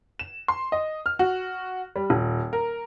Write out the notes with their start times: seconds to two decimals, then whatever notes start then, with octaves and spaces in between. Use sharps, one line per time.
0.19 E7
0.48 C6
0.72 D#5
1.06 F6
1.19 F#4
1.96 G3
2.10 D#1
2.53 A#4